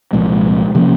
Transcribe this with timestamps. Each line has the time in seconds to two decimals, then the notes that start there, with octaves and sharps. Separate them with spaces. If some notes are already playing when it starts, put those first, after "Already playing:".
0.13 C2 A#2 F3 G#3
0.75 C3 F3 A#3 C#4